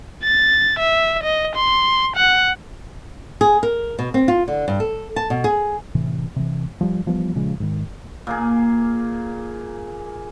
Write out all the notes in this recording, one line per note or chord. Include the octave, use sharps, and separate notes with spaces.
A6
E5
D#5
C6
F#5
G#4
A#4
B2
C4
F4
D3
G2
A4
A5
B2
G#4
A2 C3 E3
C3 E3
F3 G3
E3 F3 G3 B3
A#2 C#3 F3 G#3
G#2 D#3
A#2 A#3 G#4